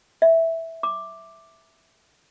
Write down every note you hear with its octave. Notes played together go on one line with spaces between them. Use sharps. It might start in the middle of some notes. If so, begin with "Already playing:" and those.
E5
D6